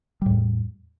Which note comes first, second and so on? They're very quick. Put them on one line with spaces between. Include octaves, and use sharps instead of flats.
G3 A2 E2